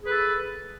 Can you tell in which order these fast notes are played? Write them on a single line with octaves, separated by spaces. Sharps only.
G#4 B4 A4